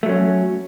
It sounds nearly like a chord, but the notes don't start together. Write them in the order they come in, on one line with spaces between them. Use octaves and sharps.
A3 F#3 C#4